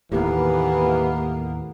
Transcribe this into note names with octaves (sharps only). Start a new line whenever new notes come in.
D#2 A2 E3 A#3 B3 G4